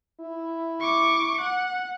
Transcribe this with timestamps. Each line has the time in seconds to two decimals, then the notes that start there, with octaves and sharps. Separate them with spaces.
0.20 E4
0.81 C#6 D6
1.41 F#5